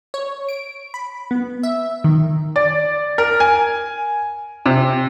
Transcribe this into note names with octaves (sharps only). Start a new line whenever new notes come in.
C#5
D7
B5
B3
E5
D#3
D5
A#4
G#5
C3